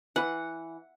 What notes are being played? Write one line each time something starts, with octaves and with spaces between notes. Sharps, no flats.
E3 F#5